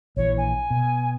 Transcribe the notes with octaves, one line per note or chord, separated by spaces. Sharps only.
A#1 E3 C#5
G#5
B2